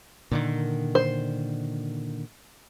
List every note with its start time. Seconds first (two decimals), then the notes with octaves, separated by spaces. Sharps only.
0.31 A#2 D3 D#3
0.95 C5